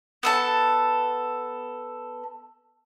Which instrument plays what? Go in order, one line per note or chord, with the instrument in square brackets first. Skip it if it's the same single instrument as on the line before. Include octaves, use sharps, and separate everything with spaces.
[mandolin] B3 A4 A5